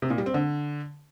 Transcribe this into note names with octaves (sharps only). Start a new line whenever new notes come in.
C3
A#2
G3
C4
D3